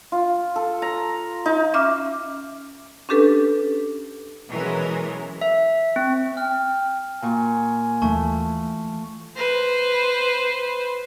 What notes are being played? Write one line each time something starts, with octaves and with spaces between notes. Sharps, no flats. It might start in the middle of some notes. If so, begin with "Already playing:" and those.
F4
A4
A#5
D#4
C#4 E5 D6 F6
C#4 D4 G4 A4 B4
B2 E3 F#3 G#3 C#4 A#4
E5
C4
G5 F6
A#2 G#5 C#6
D#2 E3 A3 A5 C#6
B4 C5